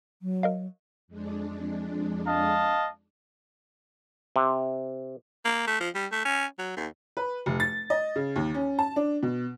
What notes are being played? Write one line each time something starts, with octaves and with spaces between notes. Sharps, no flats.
F#3
A#4 D#5 F5
F2 G#3 D4
D#5 F5 A5
C3
A#3
A3
F3
G3
A3
C#4
F#3
D#2
B4
F1
A6
D#5
C#3
D#2
C#4
A5
D4
B2